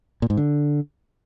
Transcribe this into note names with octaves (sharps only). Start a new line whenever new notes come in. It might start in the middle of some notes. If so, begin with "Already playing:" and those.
A#2
G#2
D3